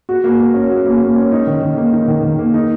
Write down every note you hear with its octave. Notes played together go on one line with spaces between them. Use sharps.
F#4
A#3
A#3
C#4
F#4
A#3
A#3
C#4
D#4
D#3
D#3
A#3
D#4
D#3
D#3
A#3
D#4